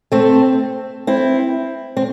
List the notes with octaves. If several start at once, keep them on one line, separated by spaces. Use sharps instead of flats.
A3 C4
C4 E4
C4